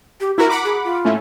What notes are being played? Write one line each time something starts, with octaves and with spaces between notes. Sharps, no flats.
G4
E4 F#4 A#4 A#5
F#5 B5 D6
G#4
F4
A2 A3 C#4